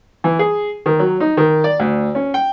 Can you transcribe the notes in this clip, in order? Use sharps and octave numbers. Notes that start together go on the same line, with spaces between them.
E3
G#4
D#3
F#3
D#4
D#3
D5
D2
C#4
G5